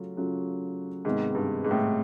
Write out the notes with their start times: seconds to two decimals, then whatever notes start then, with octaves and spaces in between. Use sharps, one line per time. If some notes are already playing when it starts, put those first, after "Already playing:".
Already playing: C#3 F#3 A3 C#4 F4
0.17 C#3 F#3 A3 C#4 F4
1.05 G#2 C3 D#3 G#3 B3 D#4
1.35 G2
1.64 G#2
1.71 A2